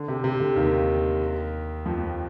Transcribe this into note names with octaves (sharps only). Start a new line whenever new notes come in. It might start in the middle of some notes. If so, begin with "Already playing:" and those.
Already playing: D3
C3
C3
D3
D#2 D#3
F2 F3